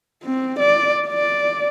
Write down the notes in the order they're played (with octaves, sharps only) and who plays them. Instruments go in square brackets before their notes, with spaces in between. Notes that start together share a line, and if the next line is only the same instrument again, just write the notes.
[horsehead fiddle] C4
D5
D5